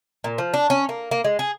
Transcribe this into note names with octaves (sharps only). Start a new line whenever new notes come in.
A#2
F3
D4
C#4
A#3
A#3
G#3
G#4